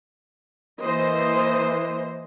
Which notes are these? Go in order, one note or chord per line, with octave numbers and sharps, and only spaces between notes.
E3 A#3 C5 D#5